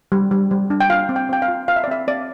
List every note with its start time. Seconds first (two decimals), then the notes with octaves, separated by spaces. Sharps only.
0.12 G3
0.31 G3
0.51 G3
0.70 D4
0.80 G5
0.89 F4 F5
1.09 C4
1.16 G5
1.29 C4 G5
1.42 F5
1.48 F4
1.68 F4 F5
1.76 E5
1.84 D5
1.88 C4 E5
2.07 C4 D5